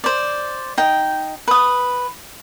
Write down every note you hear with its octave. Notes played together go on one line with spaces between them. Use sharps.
C5 D5
D#4 G5
B4 D#6